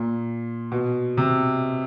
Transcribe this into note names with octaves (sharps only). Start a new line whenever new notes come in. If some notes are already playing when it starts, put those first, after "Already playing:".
Already playing: A#2
B2
C3